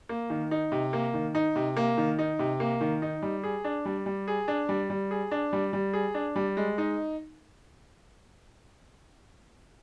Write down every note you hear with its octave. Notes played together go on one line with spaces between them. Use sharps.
A#3
D#3
D#4
C3
A#3
D#3
D#4
C3
A#3
D#3
D#4
C3
A#3
D#3
D#4
G3
G#4
D4
G3
G3
G#4
D4
G3
G3
G#4
D4
G3
G3
G#4
D4
G3
G#3
D#4